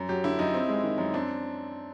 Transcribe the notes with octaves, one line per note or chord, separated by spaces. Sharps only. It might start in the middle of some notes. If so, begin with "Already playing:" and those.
Already playing: F#2
F#3 G4
D3 E4
F#2 D#4
C4
G#3
D#3
F#2
C4 D4